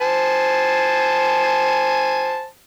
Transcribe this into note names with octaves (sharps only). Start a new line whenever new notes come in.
C5 G#5 A5